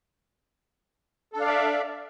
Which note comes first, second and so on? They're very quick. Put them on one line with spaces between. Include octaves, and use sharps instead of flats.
A4 D4 F5 D5 E5